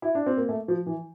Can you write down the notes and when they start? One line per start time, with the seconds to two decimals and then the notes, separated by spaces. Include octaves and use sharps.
0.02 E4
0.15 D4
0.26 C4
0.37 A#3
0.49 A3
0.68 F3
0.86 E3